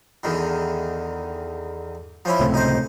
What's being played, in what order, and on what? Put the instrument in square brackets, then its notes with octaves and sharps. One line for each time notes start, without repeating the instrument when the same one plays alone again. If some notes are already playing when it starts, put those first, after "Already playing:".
[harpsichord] E2 D3 D#3
F3 C#4 E4
[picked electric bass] C#2 A2 C3
[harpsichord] D#4 C5